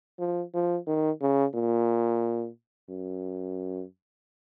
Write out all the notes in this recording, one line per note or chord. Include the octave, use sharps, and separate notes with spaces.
F3
F3
D#3
C#3
A#2
F#2